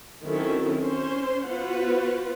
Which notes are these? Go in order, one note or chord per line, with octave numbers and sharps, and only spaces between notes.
D#3 F#3 C4 C#4 E4 A4
C#4 C5 C6
B3 F4 F#4 B4 C5 F#5